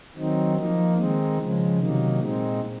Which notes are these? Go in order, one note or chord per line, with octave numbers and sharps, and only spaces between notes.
D#3 F#3 C4 D#4
F3 A#3 D#4
D#3 G#3 C4 D#4
C#3 F3 G#3
C3 D#3 F#3 A#3 D#4
A#2 G#3 C4 D#4